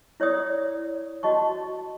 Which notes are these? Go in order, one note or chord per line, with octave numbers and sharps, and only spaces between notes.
E4 C#5 D5 D#6
F#4 D#5 A5 C#6